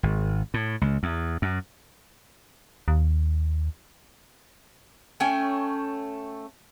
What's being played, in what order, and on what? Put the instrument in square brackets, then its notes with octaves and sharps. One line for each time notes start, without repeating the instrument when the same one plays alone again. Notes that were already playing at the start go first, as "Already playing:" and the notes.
[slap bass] G#1
A2
C#2
E2
F#2
[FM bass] D#2
[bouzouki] A3 C#4 G5 G#5